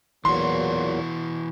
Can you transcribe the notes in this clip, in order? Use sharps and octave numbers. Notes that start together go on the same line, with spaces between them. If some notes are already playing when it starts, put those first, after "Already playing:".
E2 A#2 E3 F#3 F#4 C6